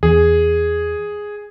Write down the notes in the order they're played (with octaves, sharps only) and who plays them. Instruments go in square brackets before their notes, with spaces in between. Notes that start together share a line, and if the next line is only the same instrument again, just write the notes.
[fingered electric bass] E2 [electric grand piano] G#4